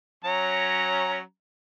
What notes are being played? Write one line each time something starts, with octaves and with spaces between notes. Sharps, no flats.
F#3 C#4 A#5